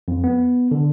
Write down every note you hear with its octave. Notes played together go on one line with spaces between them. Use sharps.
F2
B3
D3